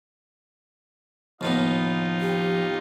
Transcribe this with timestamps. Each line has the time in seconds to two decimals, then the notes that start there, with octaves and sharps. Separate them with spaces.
1.41 D#2 A2 F3 B3 D#4 F4
2.21 G4